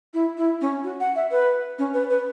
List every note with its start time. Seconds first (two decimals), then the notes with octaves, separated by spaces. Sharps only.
0.14 E4
0.37 E4
0.61 C#4
0.84 F#4
1.00 F#5
1.16 E5
1.31 B4
1.79 C#4
1.94 B4
2.10 B4